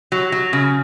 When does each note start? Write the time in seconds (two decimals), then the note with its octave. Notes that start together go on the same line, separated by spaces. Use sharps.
0.12 F#3
0.32 F#3
0.53 C#3